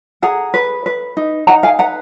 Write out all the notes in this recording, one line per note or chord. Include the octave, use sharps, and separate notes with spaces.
G#4 F#5 A#5
B4
B4
D#4
D#4 F#5 A#5
F5 G#5
B4 F#5 A#5